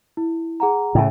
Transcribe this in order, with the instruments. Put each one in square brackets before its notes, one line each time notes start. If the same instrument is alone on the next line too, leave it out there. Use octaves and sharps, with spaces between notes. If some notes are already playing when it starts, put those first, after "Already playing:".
[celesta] E4
G#4 F#5 A#5
[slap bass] A2 C#3